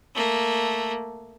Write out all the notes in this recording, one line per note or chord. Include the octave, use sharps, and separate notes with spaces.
A3 A#3